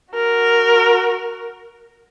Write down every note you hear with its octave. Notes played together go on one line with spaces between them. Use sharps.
F#4 A#4